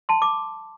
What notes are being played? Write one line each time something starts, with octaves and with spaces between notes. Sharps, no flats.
A5 C6
D6